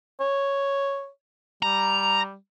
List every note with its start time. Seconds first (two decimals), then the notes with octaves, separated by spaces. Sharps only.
0.21 C#5
1.63 G3 A#5